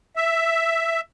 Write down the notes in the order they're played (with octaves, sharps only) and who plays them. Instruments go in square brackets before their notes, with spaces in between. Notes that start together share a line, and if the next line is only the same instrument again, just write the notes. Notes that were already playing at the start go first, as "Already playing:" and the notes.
[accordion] E5